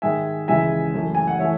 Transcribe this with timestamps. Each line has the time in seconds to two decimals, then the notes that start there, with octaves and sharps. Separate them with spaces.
0.02 G#2 D#3 G#3 E5 G#5
0.48 C#2 C#3 E3 G#3 E5 G#5
0.94 F#2 E3 A3
1.15 G#5
1.27 F#5
1.40 E3 A3 C#5 E5